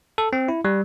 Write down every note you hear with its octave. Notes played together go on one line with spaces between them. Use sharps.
A4
C4
E4
G3